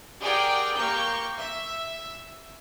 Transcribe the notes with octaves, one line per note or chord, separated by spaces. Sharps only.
G4 G#4 A#4 D5 F#5 G5
A#3 G4 C#6 G6
E5